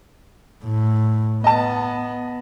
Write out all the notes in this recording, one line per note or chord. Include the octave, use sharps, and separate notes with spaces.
A2
B3 D#5 A5